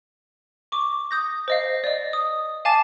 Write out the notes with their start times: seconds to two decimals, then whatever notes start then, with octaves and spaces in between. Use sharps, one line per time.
0.72 C#6 D6
1.11 D#6 G6 A#6
1.48 C5 D#5 F5
1.84 D5 D#5
2.13 D#6
2.65 F5 G#5 A5 D6 A6 E7